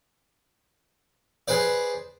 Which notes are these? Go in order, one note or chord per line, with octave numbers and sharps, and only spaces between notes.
G#4 B4 C5 D5